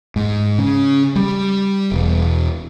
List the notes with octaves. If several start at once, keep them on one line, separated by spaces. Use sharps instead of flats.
G#2
C#3
G3
E1